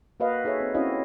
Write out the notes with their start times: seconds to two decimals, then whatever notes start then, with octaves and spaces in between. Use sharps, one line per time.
0.20 A#3 F#4 B4 D#5 F5
0.44 D#4 G#4 A4 C#5 E5
0.61 C4
0.74 C4 C#4 E4 F#4 D#5 F5